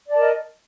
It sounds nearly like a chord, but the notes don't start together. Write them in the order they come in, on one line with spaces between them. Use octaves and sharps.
D5 A5 A#4 D#5